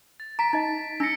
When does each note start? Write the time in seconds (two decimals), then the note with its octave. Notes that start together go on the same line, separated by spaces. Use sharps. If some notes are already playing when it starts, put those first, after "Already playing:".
0.20 A6
0.39 A#5 B6 D7
0.53 D#4 D#5
1.00 D4 E6 A#6 C#7